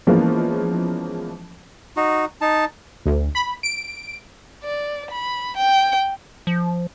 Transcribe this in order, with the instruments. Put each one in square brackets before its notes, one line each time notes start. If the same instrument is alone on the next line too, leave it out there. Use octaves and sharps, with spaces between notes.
[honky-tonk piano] E3 F3 G#3 A#3 B3 C#4
[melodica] D#4 F#4
D#4 A5
[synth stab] D2
B5
D7
[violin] D5
B5
G5
[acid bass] F3